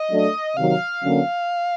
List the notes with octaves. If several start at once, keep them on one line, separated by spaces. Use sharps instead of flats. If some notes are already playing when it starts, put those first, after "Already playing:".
Already playing: D#5
F#3 A3 D4
C3 D#3 F#3 F5
D3 F#3 A#3 C#4